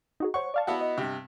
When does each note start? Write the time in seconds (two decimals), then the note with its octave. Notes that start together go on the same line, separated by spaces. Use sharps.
0.20 D#4 F#4 G#4
0.34 C5 C#5 F#5 C#6
0.54 D5 F5 A5
0.67 B3 E4 F#4
0.81 D#5
0.98 G2 C3